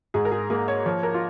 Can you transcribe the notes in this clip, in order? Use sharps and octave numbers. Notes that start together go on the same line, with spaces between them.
G#2 G#4
A#4
G#4
A#3 G#4
C#5
F3 C#5
A#4
F4